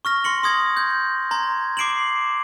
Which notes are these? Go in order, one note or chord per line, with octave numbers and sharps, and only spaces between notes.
C#6 F6 A#6
C6 A#6 C#7 F#7
C6 D#6 G#6 A#6
G6
A#5 C6 G#6
D6 C7 D7 E7 F#7